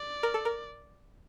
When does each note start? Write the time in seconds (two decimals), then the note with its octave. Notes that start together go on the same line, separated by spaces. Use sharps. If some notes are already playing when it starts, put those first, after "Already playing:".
Already playing: D5
0.23 A#4
0.34 A4
0.45 A#4